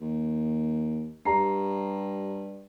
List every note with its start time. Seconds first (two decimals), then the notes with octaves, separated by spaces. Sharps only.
0.01 D#2
1.25 G2 G3 A#5 C7